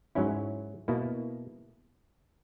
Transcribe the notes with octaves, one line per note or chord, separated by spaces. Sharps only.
G#2 F#3 C#4 E4
B2 A#3 E4